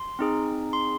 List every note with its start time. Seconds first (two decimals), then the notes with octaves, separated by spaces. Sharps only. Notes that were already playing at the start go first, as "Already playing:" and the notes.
Already playing: C6
0.19 C4 D#4 G#4
0.73 C6